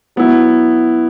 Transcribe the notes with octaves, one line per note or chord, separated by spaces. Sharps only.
F#3 B3 E4